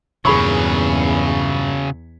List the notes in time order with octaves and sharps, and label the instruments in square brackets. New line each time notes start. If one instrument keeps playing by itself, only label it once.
[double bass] E2 [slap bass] G2 A#2 [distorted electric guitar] C#3 F#3 [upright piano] G#4 B5 C#6